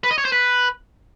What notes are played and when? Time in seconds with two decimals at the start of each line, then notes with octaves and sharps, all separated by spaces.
0.04 B4
0.11 D#5
0.18 C#5
0.25 C5
0.32 B4